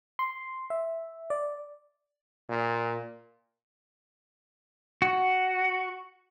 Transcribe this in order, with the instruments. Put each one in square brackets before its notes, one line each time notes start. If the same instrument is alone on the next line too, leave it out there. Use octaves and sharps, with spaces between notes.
[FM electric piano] C6
E5
D5
[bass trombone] A#2
[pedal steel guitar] F#4